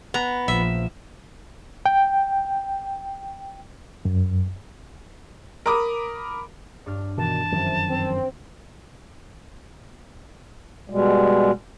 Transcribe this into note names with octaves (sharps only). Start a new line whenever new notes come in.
B3 A#5
A#1 F3 E5
G5
F#2
A#4 A#5 B5 D6 D#6
G2 D4 F6
B2 D#3 E3 A5
F#2 C3 D#3 F3
C4
B2 G3 G#3